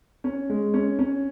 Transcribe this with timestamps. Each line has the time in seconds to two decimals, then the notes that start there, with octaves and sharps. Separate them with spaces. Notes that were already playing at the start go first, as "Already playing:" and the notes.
0.24 C#4
0.50 G#3
0.74 C#4
0.99 C#4